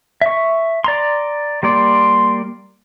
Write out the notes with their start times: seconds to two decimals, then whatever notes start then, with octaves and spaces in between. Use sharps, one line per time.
0.21 E5 C#6
0.84 D5 A#5 C6
1.63 G3 A#3 D5 C6